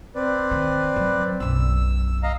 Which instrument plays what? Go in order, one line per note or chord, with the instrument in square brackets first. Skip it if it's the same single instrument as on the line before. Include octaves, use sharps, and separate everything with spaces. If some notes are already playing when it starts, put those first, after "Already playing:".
[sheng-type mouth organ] C4 B4 D5
[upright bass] D#3
F#3
[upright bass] B1 F#2 [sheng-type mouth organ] E6
[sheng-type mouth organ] D#5 F5 A#5